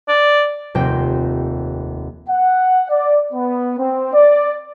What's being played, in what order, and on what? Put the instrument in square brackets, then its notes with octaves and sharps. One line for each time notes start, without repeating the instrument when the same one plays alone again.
[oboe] D5
[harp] F1 D#2 C3 C4 G5 A#6
[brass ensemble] F#5
D5
B3
C4
D5